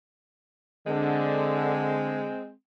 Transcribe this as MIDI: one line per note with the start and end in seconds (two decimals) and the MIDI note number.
0.87 2.33 50
0.87 2.52 56
0.87 2.52 60